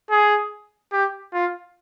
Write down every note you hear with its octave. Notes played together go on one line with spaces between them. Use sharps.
G#4
G4
F4